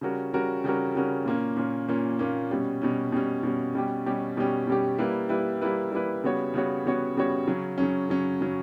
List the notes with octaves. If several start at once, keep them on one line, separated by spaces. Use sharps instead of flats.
C#3 G3 C#4 F#4 A#4
C#3 G3 C#4 F#4 A#4
C#3 G3 C#4 F#4 A#4
C#3 G3 C#4 F#4 A#4
A#2 A#3 C#4
A#2 A#3 C#4
A#2 A#3 C#4
A#2 A#3 C#4
B2 G3 C#4
B2 G3 C#4
B2 G3 C#4
B2 G3 C#4
B2 G3 C#4 G4
B2 G3 C#4 G4
B2 G3 C#4 G4
B2 G3 C#4 G4
G3 A#3 E4 B4
G3 A#3 E4 B4
G3 A#3 E4 B4
G3 A#3 E4 B4
C#3 G3 B3 F#4 C#5
C#3 G3 B3 F#4 C#5
C#3 G3 B3 F#4 C#5
C#3 G3 B3 F#4 C#5
C#3 F#3 C#4
C#3 F#3 C#4
C#3 F#3 C#4
C#3 F#3 C#4